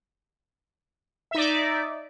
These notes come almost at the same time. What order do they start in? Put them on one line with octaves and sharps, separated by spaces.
E5 D#4 D5